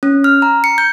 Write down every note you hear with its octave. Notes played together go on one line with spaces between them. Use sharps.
C#4
F6
A#5
C#7
G6